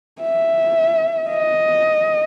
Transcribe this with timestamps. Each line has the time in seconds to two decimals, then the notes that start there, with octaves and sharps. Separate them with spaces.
0.22 E5
1.29 D#5